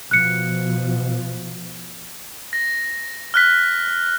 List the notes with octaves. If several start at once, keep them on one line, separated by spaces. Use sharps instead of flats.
B2 F3 F#6 C#7
A#6
F6 F#6 B6